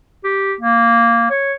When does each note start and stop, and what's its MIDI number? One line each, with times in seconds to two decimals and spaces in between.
0.24 0.53 67
0.61 1.30 58
1.30 1.54 73